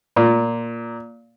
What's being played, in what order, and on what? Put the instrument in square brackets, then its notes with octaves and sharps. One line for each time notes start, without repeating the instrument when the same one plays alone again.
[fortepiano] A#2